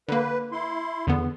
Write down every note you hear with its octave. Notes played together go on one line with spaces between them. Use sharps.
D3 A#3 B4
E4 C6
E2 D3 B3